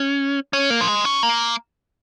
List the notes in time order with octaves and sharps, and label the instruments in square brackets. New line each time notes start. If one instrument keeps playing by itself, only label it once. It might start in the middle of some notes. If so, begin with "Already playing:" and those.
Already playing: [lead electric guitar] C#4
C#4
A#3
F3
G#3
C#4
A#3